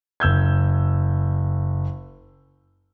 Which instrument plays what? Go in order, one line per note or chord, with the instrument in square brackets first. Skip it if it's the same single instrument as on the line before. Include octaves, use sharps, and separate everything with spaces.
[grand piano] F#1 E6 G6 G#6